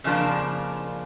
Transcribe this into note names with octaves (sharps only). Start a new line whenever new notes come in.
F2 C#3 F3 A#3 D4